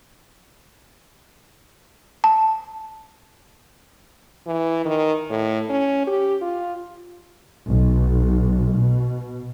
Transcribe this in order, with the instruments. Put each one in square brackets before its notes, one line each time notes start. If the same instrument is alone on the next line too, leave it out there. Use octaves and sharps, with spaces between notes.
[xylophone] A5
[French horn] E3
D#3
A2
C#4
G4
F4
[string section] B1
B2